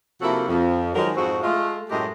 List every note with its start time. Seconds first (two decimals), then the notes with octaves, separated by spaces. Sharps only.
0.21 C3 F3 A#3 E4 F#4 A4
0.48 F2
0.95 D#3 F3 F#3 G#3 A#4
1.16 F2 G#2 C4 D#4 F#4
1.43 G#3 A3 F4
1.90 F#2 A2 G#3 A3 G4 A#4